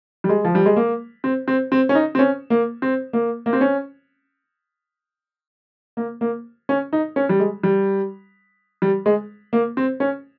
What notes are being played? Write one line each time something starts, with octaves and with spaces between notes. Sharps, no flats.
G3
G#3
F3
G3
G#3
A#3
C4
C4
C4
C#4
D#4
C4
C#4
A#3
C4
A#3
A#3
C4
C#4
A#3
A#3
C#4
D#4
C#4
G3
G#3
G3
G3
G#3
A#3
C4
C#4